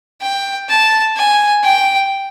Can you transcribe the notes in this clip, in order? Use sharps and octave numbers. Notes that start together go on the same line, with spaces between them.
G5
A5
G#5
G5